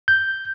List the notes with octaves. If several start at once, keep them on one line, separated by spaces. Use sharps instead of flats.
G6